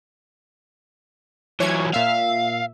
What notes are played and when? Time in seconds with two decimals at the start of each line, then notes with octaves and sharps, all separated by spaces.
1.60 E3 F#3 C#5 G#6
1.94 A#2 E5 F5